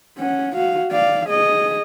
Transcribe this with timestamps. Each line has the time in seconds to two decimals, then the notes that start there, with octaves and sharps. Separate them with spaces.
0.17 C#4 F#5
0.56 F#4 F5
0.92 D5 F5
1.29 G#4 D#5